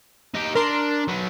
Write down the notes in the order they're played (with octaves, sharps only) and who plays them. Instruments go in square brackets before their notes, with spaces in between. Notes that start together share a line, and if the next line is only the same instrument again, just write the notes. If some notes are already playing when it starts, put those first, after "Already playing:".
[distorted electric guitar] D#4 G4
[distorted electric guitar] D4 [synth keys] A#4 C6
[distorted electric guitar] F#3 B3